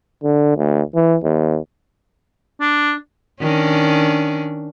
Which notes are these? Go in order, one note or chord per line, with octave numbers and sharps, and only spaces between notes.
D3
D2
E3
D#2
D4
D#3 C#4 D4